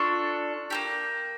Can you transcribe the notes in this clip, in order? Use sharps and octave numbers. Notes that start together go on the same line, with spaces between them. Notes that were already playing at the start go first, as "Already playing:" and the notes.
Already playing: D4 F4 A4 C#6
A#3 E4 G4